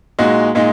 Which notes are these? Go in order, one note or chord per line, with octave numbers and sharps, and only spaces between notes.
A#2 G#3 D#4 F#4
A#2 G#3 D#4